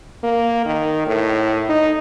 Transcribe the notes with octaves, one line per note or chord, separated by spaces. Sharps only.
A#3
D#3
A2
D#4